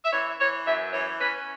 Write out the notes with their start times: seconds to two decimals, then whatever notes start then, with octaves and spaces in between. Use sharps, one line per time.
0.05 E5
0.12 E3 C#5
0.40 E3 C#5
0.66 F#2 E5
0.93 E3 C#5
1.19 C#4 B4